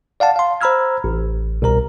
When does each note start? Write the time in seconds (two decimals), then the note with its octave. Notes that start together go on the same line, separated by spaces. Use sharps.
0.20 D5 F5 F#5 A5
0.36 F5 C6
0.61 C5 A#5 B5 E6 F6 G#6
1.04 A1
1.62 C2 B2 A#4 A#5